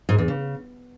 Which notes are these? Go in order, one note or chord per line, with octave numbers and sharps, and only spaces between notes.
G#2
E2
C#3